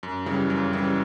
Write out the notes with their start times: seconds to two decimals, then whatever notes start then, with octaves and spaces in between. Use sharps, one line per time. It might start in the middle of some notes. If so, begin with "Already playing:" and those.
0.03 F#2
0.26 C#3 E3 G3
0.50 F#2
0.73 C#3 E3 G3